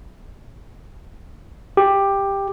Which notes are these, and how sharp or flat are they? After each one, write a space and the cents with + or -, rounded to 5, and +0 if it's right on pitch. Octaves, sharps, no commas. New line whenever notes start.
G4 +10